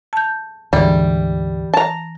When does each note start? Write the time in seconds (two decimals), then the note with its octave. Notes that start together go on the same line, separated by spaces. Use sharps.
0.13 A5 G6
0.73 D2 G#2 D3 E3 G3
1.74 A5 A#5